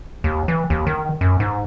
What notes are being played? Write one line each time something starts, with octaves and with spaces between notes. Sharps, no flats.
D#2
E3
D#2
D#3
F#2
G#2